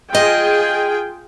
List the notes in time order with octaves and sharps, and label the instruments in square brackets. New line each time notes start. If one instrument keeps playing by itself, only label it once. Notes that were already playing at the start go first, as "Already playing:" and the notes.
[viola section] F4 G#4 G5 [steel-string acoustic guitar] D#5